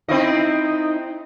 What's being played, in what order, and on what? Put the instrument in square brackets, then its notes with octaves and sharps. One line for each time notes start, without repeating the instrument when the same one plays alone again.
[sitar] C4 E4 D#5 [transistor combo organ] D#4